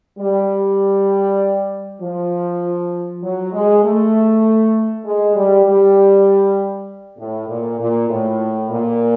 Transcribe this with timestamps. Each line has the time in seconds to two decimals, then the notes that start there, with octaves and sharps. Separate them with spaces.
0.19 G3
2.02 F3
3.23 F#3
3.53 G#3
3.84 A3
5.05 G#3
5.36 G3
5.66 G3
7.19 A2
7.49 A#2
7.79 A#2
8.09 A2
8.70 A#2